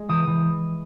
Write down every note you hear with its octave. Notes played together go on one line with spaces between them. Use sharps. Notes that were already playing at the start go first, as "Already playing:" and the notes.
Already playing: G#3
E3 D#6
E3